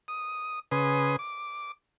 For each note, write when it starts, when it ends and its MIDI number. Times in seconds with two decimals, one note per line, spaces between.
0.08 0.59 87
0.71 1.16 49
0.71 1.16 71
0.71 1.16 80
0.71 1.16 84
0.71 1.16 87
1.19 1.72 86